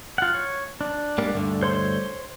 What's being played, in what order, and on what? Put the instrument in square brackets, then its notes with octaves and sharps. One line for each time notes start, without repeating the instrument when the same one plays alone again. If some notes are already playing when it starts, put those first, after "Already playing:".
[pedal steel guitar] F4 F#5
C#5
D4
[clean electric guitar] G#2 G3 A#3
D2 G2 D3
[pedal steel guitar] C5 C#5 C6